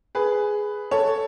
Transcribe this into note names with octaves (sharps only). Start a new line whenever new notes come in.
G#4 B4
A4 C#5